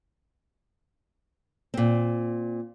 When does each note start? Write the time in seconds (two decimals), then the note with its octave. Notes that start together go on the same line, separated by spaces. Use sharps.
1.74 A#2 C4